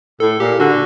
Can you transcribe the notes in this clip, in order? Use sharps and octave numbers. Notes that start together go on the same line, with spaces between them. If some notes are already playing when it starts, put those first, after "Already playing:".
A2 A4
A#2 G4
D3 F#4